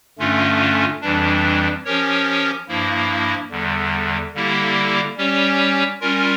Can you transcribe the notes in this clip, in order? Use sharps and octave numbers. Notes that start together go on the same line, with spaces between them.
G2 D3 A3 C#4 F4
F2 E3 G3 D4
F3 C#4 G4 A#4 C#5
G2 F3 A#3 E4
E2 D3 G3
D3 G3 A#3 E4 G4
G3 C#4 G4 C#5
G3 C#4 F4 A#4